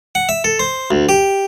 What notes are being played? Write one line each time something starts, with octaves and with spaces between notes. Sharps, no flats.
F#5
E5
A4
C5
D2
G4